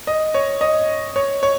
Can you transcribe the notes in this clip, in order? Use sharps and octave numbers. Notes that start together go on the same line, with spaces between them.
D#5
C#5
D#5
C#5
C#5